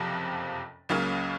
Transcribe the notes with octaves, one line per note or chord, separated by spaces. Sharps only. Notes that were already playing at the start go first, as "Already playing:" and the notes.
Already playing: F#1 F2 C3 F3
C#2 C#3 F#3 A#3 C#4